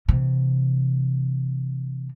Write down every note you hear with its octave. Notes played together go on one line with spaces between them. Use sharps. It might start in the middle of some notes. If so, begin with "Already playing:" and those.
C3 E3